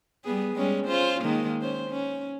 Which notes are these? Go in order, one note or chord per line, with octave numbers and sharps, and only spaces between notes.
G3 B3 G#4
G3 G#3 C#4
C#4 F4 C5
D#3 G#3 A#3
C#4 C5
C#4